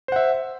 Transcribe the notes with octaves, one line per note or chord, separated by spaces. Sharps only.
C5 E5 F#5